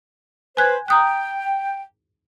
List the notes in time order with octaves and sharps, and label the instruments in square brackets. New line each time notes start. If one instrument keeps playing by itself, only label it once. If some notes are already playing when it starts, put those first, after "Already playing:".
[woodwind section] B4 C5 [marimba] G#5 F#6 G#6
[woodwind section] G5 [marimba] A#5 D#6 F#6